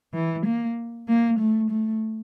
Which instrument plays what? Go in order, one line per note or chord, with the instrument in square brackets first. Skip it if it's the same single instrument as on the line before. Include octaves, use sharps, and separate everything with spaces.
[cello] E3
A#3
A#3
A3
A3